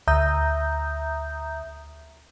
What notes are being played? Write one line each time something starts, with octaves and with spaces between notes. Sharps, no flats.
D2 E5 A#5 D#6 G6